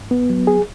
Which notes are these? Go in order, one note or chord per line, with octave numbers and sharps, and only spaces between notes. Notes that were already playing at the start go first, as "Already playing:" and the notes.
Already playing: G#2
B3
F#3
G#4